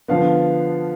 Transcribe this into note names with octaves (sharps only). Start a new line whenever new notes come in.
D3 F3 B3 F5